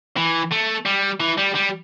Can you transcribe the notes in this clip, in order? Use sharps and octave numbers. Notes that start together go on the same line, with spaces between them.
E3
A3
G3
E3
G3
G3